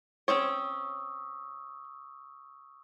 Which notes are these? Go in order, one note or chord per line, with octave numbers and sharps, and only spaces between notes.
C4 C#4 C#5 C#6 D#6 E6